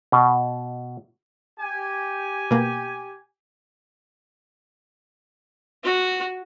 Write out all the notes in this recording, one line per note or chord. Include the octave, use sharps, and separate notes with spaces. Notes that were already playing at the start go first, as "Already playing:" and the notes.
B2
G4 G#5
B2 A#3
F#4